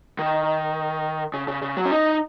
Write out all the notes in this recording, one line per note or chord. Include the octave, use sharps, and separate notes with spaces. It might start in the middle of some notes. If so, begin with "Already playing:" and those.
D#3
C#3
C#3
C#3
F#3
C#4
D#4